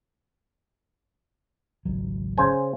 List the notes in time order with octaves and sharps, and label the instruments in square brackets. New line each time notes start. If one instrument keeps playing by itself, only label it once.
[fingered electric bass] G#1 C#2 F#3
[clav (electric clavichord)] C#3 C5 G#5